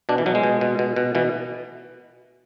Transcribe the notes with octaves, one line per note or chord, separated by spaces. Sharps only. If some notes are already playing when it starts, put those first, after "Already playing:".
B2 D4
E3
B2 F#3
G#3
B2
B2
B2
B2
B2 E3